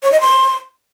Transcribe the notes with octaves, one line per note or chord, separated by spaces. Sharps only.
C#5
D#5
C6